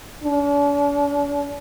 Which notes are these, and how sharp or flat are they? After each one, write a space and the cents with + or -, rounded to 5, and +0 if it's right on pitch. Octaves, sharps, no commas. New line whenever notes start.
D4 -45